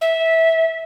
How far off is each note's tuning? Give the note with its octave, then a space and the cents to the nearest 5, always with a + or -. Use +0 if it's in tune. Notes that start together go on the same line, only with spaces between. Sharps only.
E5 -15